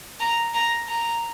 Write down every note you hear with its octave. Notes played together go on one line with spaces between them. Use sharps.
A#5
A#5
A#5